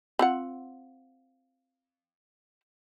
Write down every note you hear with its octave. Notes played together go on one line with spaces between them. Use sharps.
C4 F4 F#5